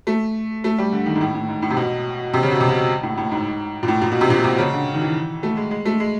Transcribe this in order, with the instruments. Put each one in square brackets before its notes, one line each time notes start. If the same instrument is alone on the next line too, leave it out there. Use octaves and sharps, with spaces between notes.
[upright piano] A3
A3
G3
D3
D#3
G#2
A2
A2
G#2
A2
C3
B2
C3
C#3
B2
C3
B2
A2
A2
G#2
A#2
A2
A#2
B2
C3
A#2
C3
C#3
D3
D#3
E3
A3
G#3
G#3
A3
G#3